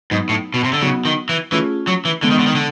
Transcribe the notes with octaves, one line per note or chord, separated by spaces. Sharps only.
G#2 F#3 B3 D#4
A2
B2
C3
D3
C#3 F#3 B3 D#4 F#4
D#3
E3
E3 A3 C#4 F4 G#4
F#3
E3
D3 E3 G#3 B3
D#3
D3
D#3
D3